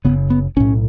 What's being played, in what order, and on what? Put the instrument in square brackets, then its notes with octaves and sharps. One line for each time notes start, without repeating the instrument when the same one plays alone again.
[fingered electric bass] F#1 F#2 C#3 B3
B3
B1 A2 C#4